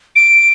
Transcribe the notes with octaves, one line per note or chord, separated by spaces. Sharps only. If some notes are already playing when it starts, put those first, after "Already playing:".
D7